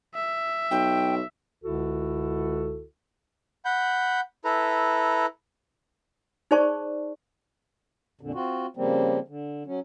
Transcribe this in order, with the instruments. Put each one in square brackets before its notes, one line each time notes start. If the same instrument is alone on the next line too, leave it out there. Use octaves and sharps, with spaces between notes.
[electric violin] E5
[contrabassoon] B1 [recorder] G5
[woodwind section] C#2 D3 E4 F#4 A4
[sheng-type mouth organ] F#5 B5 G6
E4 A4 B4 A#5
[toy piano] D#4 G#4 C5 D5 A5 C#6
[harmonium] F2 A#2 D3
C4 F4 F#4
C#3 F3 G3 A#3 C4
D3
F#3 C#4